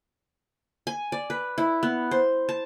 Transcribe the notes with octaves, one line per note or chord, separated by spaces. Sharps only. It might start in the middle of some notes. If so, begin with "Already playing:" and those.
G#5
D5
B4
E4
B3
C5
A5